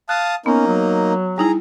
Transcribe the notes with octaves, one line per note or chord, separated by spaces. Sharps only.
F5 A5 D#6 F#6
A#3 B3 C#4 D#4
F#3
G3 D#4 E4 G#4 A#5